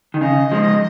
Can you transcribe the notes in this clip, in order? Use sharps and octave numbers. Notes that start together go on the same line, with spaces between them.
D#3
C#3 D#5
F3 G#3